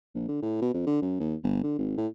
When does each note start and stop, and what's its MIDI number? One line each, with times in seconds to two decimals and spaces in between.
0.15 0.28 34
0.29 0.38 50
0.42 0.60 45
0.62 0.71 47
0.74 0.85 41
0.87 1.01 50
1.02 1.16 42
1.20 1.35 39
1.43 1.59 31
1.63 1.74 50
1.78 1.95 32
1.98 2.08 45